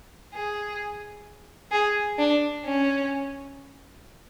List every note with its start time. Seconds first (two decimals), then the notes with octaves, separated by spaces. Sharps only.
0.34 G#4
1.72 G#4
2.18 D4
2.64 C#4